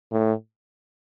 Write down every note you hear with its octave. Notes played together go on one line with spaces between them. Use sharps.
A2